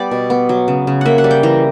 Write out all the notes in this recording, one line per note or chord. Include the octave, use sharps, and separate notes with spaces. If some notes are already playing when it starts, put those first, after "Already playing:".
Already playing: G3 B3 G4 D5
B2
B3
F#3
C#3
C#3
A#3 E5 F#5
F#5
G3
G5
E3 A#5